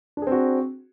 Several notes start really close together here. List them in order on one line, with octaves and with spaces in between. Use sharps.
D4 G#4 C4 F#4